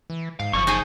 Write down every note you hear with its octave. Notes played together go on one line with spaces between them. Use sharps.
E3
G#2 F5
F#1 D3 F3 C#6
F3 D#4 G#4